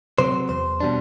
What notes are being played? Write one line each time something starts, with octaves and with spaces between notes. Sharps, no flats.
C3 F#3 C4 C5
E2 C5
B2 G3 D4